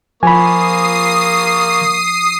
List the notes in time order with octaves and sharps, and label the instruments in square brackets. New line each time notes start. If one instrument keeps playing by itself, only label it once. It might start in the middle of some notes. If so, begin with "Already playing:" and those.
[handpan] F3 [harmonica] A#3 C#6 [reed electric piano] G#5 B5 [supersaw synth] D#6 C7